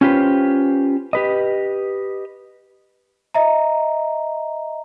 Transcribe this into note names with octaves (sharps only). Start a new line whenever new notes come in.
C#4 F4 G4 G#4 B4 C5
G4 B4 D#5
D#5 E5 A#5